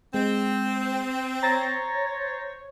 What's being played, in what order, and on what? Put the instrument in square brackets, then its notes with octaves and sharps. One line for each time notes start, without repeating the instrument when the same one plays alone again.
[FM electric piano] G#3 [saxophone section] C4
[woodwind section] C5 C#5 [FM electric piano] A#5 A6 A#6